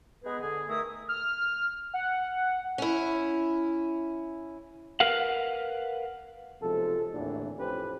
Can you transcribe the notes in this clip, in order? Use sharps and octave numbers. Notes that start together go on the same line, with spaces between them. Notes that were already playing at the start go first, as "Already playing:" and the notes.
G#3 B3 D#4 G#4 B4
D3 G#4
D#3 A3 E4 A#5 D#6
F6
F#5
C#4 E4
A#4 B4 F5 F#5
B1 C3 F3 G#3 A4
G#1 D#2 A2 D3 E3 D4
A1 F2 C#4 G4 B4 C5